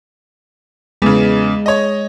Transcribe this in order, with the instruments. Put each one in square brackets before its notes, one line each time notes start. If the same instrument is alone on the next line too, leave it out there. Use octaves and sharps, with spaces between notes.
[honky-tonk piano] E2 C#3 [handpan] G#3
[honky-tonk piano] C#5 D#5